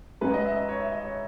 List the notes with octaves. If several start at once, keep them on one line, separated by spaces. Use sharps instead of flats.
G#2 F#3 C#4 B4
D#5
E5
D#5
C#5
E5
D#5
C#5